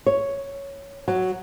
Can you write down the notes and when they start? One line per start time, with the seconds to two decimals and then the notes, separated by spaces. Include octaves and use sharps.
0.06 C#5
1.08 F#3